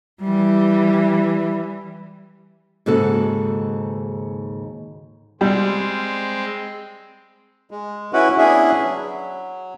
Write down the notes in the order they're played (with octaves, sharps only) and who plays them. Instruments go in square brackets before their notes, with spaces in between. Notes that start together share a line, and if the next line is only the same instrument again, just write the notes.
[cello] E3 G3
[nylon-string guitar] D#2 G#2 C#3 F#4 A4
[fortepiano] G3 [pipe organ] G#3 C4
[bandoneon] G#3
C#4 E4 F#4 B4
B3 C#4 D4 E4 G#4 E5
F#3